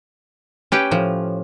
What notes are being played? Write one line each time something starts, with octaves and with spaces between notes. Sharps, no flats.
C#4 G4 B4 G5
A2 F3